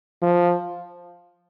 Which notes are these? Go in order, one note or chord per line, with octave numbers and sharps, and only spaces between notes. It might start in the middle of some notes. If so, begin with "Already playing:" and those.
F3